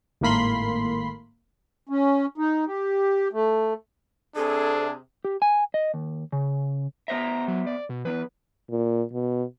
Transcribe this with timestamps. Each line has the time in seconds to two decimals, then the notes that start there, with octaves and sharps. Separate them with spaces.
0.21 G#1 A2 A#3 B5 C6
1.89 C#4
2.38 D#4
2.67 G4
3.33 A3
4.36 C3 D4 G#4 A4
5.25 G4
5.42 G#5
5.74 D#5
5.94 D#2
6.32 C#3
7.08 B3 C5 E5 A#5
7.48 F#3
7.66 D5
7.89 B2
8.05 E3 B3 B4
8.70 A#2
9.13 B2